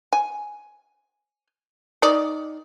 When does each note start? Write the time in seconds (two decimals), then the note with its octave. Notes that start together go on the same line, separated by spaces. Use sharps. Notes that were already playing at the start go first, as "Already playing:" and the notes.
0.13 G#5
2.02 D#3 D#4 D5